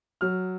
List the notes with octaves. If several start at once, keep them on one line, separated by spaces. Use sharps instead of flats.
F#3 F6